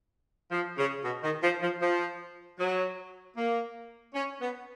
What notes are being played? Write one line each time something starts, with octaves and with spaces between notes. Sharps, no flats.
F3
C#3
B2
D#3
F3
F3
F3
F#3
A#3
C#4
B3